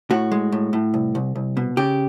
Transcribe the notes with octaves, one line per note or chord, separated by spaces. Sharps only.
A2 F#4
G#3
A2
A2
C2
C2
C2
B2
C#3 G4